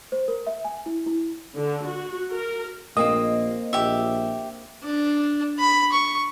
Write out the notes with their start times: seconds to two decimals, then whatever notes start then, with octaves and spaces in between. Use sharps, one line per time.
0.12 C5
0.28 A#4
0.47 E5
0.65 G#5
0.86 E4
1.06 E4
1.56 D3
1.88 F#4
2.31 A#4
2.97 A#1 A#3 C4 D#5
3.73 A#1 G4 E5
4.84 D4
5.59 B5
5.92 C#6